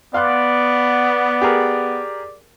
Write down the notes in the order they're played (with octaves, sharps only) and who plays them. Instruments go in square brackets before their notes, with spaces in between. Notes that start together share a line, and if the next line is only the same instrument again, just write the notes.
[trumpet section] B3 [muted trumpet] D5 [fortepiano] F5 C6 F#6
[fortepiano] G4 G#4 A#4